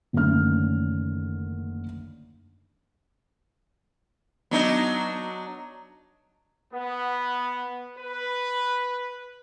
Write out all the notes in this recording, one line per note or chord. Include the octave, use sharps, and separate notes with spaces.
F#1 D3 D#3 A3 C#4 F6
F#3 B3 D4 D#4
B3
B4